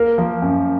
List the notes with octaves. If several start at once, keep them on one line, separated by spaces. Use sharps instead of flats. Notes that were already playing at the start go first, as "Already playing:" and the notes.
Already playing: A#3 A#4
F3 A#3
F#2